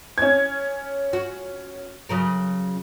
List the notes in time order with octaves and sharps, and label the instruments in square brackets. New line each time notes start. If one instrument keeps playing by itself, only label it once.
[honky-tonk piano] C#4 G#6
[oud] F#4
C#3 F#3 A#4